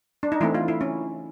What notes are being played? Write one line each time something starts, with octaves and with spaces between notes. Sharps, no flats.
D4
D#4
E3 A3 C4 E4
F4
E4
C#4